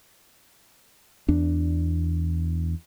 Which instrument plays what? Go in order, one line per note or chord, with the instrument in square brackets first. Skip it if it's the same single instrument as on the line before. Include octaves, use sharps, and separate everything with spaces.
[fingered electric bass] E2 D4